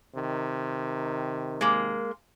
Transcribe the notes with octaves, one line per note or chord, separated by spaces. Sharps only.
C3 D#3
G#3 A#3